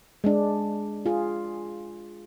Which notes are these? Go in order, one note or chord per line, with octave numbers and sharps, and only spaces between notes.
G#3 D4
F4 G#4